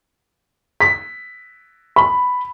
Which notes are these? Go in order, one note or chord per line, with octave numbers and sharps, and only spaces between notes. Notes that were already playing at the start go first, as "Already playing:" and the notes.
B6
B5